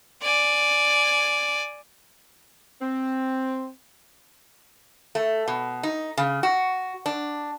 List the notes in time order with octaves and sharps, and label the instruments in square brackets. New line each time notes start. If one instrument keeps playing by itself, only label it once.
[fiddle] D5 G#5
[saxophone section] C4
[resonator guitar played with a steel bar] A3
B2
D#4
C#3
F#4
D4